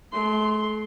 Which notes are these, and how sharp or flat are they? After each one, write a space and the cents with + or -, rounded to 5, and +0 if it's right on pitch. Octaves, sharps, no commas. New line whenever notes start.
A3 -40 C6 +0